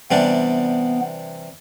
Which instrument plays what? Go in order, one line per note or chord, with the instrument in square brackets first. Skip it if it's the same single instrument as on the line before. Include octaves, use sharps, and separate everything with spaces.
[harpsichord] C3 E3 G3 D4 [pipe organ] B3